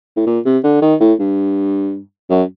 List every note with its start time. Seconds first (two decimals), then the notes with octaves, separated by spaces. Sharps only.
0.17 A2
0.27 A#2
0.45 C3
0.64 D3
0.82 D#3
1.00 A2
1.20 G2
2.30 F#2